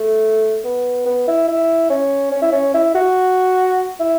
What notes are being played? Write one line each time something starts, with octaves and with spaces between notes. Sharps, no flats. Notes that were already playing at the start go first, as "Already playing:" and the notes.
Already playing: A3
B3
B3
E4
E4
C#4
C#4
E4
C#4
E4
F#4
E4